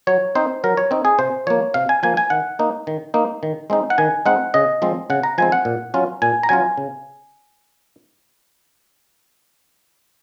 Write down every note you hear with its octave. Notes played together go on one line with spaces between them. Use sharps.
F#3 C#5
C4 D#4 C5
F#3 A#4
C#5
C4 D#4
G#4
C3 C5
F3 A#3 C#5
C3 F5
G#5
F3 A#3 G#5
G#5
D#3 F#5
A#3 D#4
D#3
A#3 D#4
D#3
G#3 C4 D#4
F#5
D#3 G#5
G#3 C4 D#4 F#5
C#3 D#5
F3 G#3 C4
C#3 F#5
A#5
F3 G#3 C4 G#5
F#5
A#2
F#3 C#4 F4
A#2 G#5
A#5
F#3 C#4 F4 G#5
C#3